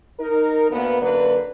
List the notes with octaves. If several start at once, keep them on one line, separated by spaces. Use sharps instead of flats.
D#4 A#4
D2 A#3 B3
F#2 D3 A#3 B4